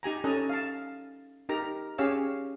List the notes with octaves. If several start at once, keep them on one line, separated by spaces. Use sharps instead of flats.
D#4 G4 G#5 A#5
C#4 A4 D#5 G#5 A#5
F5 A5
D#4 G4 A#4 A#5
C#4 G4 G#4 C#5 F5 E6